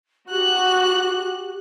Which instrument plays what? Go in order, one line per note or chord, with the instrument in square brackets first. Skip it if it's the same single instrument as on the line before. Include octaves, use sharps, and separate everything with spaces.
[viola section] F#4 [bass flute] G4 [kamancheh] F#6